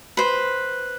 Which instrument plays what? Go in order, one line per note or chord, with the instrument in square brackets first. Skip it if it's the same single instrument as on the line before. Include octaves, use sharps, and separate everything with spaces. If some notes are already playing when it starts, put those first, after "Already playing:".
[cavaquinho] B4 C5